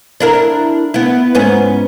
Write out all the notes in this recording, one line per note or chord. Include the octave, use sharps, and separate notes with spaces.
D4 E4 A#4
B3 E4
G#2 B3 C#4